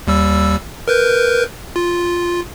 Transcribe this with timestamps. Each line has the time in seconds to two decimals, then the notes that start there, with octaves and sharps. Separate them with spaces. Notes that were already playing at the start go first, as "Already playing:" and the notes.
0.07 D#2 G3 E6
0.88 A#4 B4 G6
1.76 F4